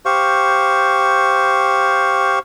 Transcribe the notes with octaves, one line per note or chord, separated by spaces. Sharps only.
G4 C5 F5 C#6